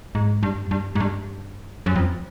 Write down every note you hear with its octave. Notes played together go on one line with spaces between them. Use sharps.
G#2
G2
G2
G#2
G2
F#2
F2